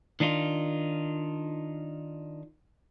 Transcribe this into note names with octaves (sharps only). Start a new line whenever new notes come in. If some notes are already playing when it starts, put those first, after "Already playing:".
D#3 D4 D#4 F4